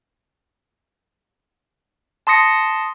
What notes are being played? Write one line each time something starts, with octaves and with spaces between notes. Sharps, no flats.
A5 C6 D#6 A#6 C#7